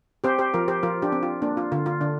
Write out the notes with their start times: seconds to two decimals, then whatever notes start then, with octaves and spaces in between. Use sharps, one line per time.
0.24 C4 G4 C5
0.39 G4 C5
0.54 F3 F4 A#4
0.68 G4 C5
0.83 F3 F4 A#4
1.02 D4 G4
1.12 C4
1.23 F4
1.42 A#3 D4
1.57 F4
1.72 D3 F4
1.86 F4
2.01 D3 D4